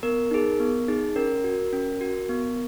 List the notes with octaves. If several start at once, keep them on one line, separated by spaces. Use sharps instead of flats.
B3 A#4
D#4 G#4
B3
D#4 G#4
C#4 A#4
F#4
C#4
F#4
B3